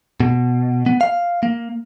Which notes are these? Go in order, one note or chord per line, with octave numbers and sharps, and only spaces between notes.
B2
B3
F5
A#3